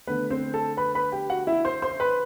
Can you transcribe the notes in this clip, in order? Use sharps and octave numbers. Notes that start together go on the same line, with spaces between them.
D3 A3 B3 B4
C4 C5
A4 A5
B4 B5
B4 B5
G4 G5
F#4 F#5
E4 E5
C5 C6
C5 C6
B4 B5